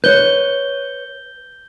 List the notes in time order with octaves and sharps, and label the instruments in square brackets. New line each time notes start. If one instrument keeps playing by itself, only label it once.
[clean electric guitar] B4 C#5 [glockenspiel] G6 G7